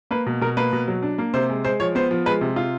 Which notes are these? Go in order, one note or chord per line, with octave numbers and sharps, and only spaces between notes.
A#3 B4
B2
B2 A#4
A#3 B4
B2
F#3
D4
A#3
C3 C5
G#3
G#3 C5
F3 C#5
B3 C5
F3
G#3 B4
C3
F4